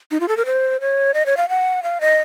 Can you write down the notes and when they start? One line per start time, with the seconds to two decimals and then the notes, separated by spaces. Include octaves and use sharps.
0.11 D#4
0.20 F4
0.28 A4
0.37 A#4
0.46 C5
0.81 C#5
1.14 D#5
1.26 C#5
1.37 F5
1.49 F#5
1.83 F5
2.01 D#5